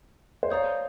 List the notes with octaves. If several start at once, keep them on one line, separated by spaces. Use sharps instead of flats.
C5
C#5 D5 F5 A#5 D#6 G6